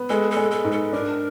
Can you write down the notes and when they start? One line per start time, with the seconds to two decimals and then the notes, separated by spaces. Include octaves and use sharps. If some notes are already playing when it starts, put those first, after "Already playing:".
Already playing: B3
0.10 G#3 A4
0.31 A4
0.37 G#3
0.51 A4
0.64 G#2
0.72 A4
0.93 D4 A#4